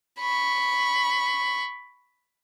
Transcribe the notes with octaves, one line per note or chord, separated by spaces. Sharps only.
B5 C#6